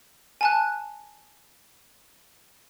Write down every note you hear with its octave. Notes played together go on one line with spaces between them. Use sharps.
G#5 A5 F#6